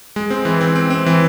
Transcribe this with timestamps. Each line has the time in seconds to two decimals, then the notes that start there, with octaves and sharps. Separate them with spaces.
0.16 G#3
0.30 C4
0.45 E3
0.61 C4
0.76 C4
0.90 C4
1.06 E3